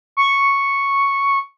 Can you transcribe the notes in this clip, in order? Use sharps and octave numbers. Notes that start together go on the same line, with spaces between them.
C#6